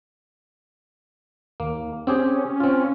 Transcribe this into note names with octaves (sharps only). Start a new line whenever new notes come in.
D#2 A#3
C4 C#4 G4 G#4
C4 F4